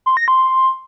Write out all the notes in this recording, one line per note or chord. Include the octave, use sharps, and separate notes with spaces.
C6
A#6
C6